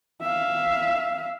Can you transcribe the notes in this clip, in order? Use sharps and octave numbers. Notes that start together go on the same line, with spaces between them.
E5 F5